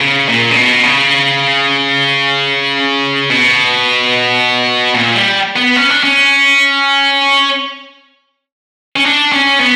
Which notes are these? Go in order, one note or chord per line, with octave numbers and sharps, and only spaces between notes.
C#3
A#2
C#3
B2
C#3
B2
A#2
G3
B3
C#4
D4
C#4
C#4
D4
C#4
B3